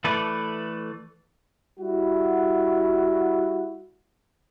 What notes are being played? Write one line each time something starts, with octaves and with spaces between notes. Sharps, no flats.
E3 A3 A4 B4 D5
G3 E4 F#4